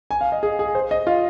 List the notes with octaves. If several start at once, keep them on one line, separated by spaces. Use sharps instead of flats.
G#5
F5
D#5
G#4
G#4
C5
D#5
F4